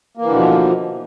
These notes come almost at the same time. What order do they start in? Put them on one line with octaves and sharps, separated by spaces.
A#3 E3 D3 B2 F3